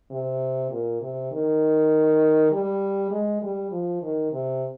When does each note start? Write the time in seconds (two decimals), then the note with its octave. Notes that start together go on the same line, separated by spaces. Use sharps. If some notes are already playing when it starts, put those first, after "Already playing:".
0.11 C3
0.71 A#2
1.01 C3
1.32 D#3
2.51 G3
3.11 G#3
3.42 G3
3.71 F3
4.02 D#3
4.32 C3